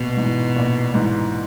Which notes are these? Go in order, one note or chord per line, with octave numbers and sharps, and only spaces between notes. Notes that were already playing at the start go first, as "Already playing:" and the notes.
Already playing: A#1 B2
G#2 E3
A#1
G#2 E3